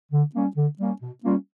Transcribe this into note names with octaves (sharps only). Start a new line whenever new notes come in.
D3
G3 A#3 C#4
D3
G3 A#3 C#4
B2
G3 A#3 C#4 F4